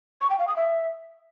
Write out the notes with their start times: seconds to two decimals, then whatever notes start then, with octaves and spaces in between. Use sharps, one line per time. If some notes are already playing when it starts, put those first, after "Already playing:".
0.21 C#6
0.30 G5
0.39 F5
0.48 D#6
0.56 E5